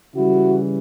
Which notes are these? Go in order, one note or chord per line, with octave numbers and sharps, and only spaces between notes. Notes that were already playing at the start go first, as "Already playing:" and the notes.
C#3 E3 G3 E4 F#4